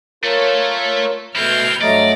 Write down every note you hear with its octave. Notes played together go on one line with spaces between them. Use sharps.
A3 F4 A4 A#4 C#5
B2 A3 C4 E4 F6 G6 G#6
G2 F#3 A3 D5 D#5 A#5